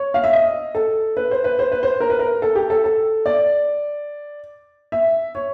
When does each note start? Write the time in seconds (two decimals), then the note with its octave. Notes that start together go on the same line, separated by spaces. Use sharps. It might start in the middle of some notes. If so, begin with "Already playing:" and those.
Already playing: C#5
0.14 F5
0.24 E5
0.33 D#5
0.75 A4
1.17 B4
1.31 C5
1.44 B4
1.59 C5
1.72 B4
1.83 C5
2.00 A#4
2.10 B4
2.19 A#4
2.42 A4
2.55 G4
2.70 A4
2.84 A4
3.26 D5
4.92 E5
5.35 C#5